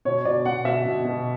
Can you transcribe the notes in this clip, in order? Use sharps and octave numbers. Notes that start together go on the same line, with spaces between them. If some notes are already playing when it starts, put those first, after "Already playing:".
B2 C#5
B2 D5
B2 F#5
B2 E5
B2
B2